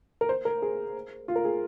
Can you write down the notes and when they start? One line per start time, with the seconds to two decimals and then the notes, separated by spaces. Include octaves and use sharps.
0.21 A#4
0.29 C5
0.45 A#4
0.62 G#4
1.28 F4
1.36 A#4
1.45 G#4